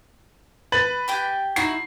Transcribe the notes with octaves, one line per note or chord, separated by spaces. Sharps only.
B4 A6 F#7
G4 G5 G#5
D#4 E4 F#4 C7